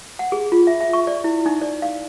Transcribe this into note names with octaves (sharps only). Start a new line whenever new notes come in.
F#5
G#4
F4
E5
E5
C#6
D5
E4
D#4
D5
F5